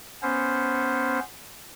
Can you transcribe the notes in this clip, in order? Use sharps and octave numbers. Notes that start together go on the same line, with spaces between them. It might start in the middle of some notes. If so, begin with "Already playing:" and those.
B3 C#4 C5